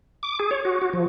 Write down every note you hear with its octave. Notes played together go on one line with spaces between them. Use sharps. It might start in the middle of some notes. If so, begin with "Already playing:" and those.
D6
G#4
C#5
F#4
F#4
F3